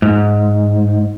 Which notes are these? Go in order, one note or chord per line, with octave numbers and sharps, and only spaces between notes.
G#2